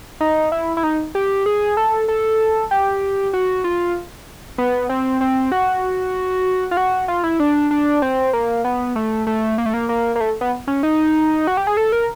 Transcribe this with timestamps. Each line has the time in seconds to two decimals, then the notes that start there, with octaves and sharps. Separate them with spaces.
0.21 D#4
0.52 E4
0.77 E4
0.83 D#4
1.15 G4
1.46 G#4
1.77 A4
2.08 A4
2.71 G4
3.33 F#4
3.64 F4
4.58 B3
4.89 C4
5.21 C4
5.52 F#4
6.71 F4
6.77 F#4
7.08 F4
7.23 E4
7.40 D4
7.71 D4
8.02 C4
8.33 A#3
8.64 B3
8.96 A3
9.27 A3
9.58 A#3
9.66 A3
9.74 A#3
9.89 A#3
10.16 A#3
10.20 A3
10.41 B3
10.67 C#4
10.83 D#4
11.47 F#4
11.57 G4
11.67 G#4
11.77 A4
11.92 A#4